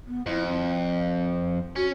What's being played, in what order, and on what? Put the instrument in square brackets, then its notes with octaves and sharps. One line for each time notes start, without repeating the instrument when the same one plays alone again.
[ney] B3
[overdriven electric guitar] F2 [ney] E4
[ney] C4
[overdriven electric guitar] C#4 [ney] F#4